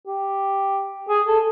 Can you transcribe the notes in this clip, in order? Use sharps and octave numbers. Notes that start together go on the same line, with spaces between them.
G4
G#4
A4